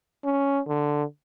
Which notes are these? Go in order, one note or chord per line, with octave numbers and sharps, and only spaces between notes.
C#4
D3